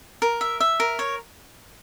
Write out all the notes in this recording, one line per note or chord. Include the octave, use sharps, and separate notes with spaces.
A#4
E5
E5
A#4
C#5